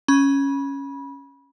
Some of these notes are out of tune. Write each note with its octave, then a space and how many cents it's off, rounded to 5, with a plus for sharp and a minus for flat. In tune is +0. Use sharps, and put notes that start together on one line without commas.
C#4 +0 B5 -25